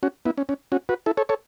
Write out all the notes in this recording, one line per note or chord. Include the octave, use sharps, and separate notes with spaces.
C#4 F#4
B3 E4
C#4
C#4
C#4 F#4
F#4 B4
E4 A4
A4 C#5
A4 C#5